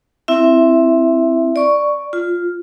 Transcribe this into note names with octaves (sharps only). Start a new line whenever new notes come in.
C4 E4 E5
D5 C#6
F4